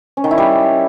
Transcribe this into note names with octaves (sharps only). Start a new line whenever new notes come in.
C#4
D#3
E4
G3